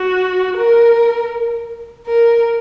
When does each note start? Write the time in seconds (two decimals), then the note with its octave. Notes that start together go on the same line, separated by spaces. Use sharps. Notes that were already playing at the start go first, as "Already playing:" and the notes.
Already playing: F#4
0.57 A#4
2.07 A#4